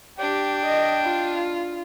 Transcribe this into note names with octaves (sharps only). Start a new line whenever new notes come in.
D4 G4 G5
D#5
F4